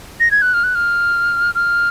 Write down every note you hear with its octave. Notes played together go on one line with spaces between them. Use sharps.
A#6
G#6
F#6
F6
F#6
F6
F6